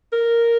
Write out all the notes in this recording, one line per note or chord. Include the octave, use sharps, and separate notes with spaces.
A#4